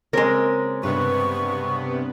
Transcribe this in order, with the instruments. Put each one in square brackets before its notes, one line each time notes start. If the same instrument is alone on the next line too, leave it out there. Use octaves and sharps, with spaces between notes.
[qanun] C#3 A#3 C4 [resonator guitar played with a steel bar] G#3 A#4
[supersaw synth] G2 C3 B3 [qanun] B4 [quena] C#6